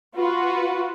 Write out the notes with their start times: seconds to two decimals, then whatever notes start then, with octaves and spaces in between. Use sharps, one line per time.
0.15 F4 F#4 B4